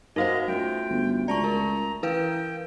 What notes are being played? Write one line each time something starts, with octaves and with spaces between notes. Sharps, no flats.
D#4 F#4 A#4 C5 D#5 F5 F#5
A3 C#4 F4 G5
G1
C#2 D5 A5 A#5 C#6
A#4
E3 A#4 B4 F5 G5